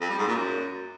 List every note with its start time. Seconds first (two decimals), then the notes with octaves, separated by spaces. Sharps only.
0.01 F2
0.10 G3
0.18 G#2
0.27 A#2
0.36 F#2